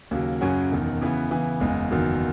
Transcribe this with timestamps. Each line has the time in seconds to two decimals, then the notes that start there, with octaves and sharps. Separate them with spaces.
0.11 D#2 C#3 F#3
0.41 F#2 C#3 F#3 C#4 F#4
0.72 E1 E2 D#3
1.01 C#3 E3 B3
1.30 C#3 E3 B3
1.60 F#1 E2 C#3 G#3
1.91 F#1 E2 D#3 F#3